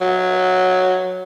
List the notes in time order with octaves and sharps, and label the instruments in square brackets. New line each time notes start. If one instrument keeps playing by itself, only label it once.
[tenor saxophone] F#3